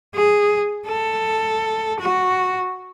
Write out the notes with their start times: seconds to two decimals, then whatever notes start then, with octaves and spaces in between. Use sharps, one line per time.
0.15 G#4
0.87 A4
2.00 F#4